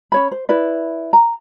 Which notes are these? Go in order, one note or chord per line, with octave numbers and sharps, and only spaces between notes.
C#4 C#5 B5
C5
E4 B4 D5
A#5